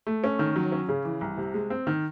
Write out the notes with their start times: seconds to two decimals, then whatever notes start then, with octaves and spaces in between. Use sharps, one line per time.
0.07 A3
0.24 C#4
0.39 D#3
0.56 F#3
0.72 C#4
0.89 C#3
1.05 E3
1.21 C2
1.37 C3
1.54 G#3
1.70 C4
1.87 D#3